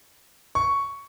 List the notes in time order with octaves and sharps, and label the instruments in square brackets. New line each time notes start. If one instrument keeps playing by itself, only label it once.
[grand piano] C#6